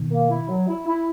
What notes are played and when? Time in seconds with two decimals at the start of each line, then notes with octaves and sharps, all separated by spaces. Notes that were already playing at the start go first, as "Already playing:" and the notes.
Already playing: B2 D#3
0.11 A#3
0.29 E4
0.49 F#3
0.68 E4
0.87 E4